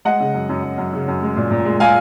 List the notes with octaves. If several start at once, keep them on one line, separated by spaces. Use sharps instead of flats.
G#3 D#5 F#5
C#3
F#2
F#2
F#2
F#2
C#3
F#2
G#3
A#2
A#2
G#3
G#3 F5 G#5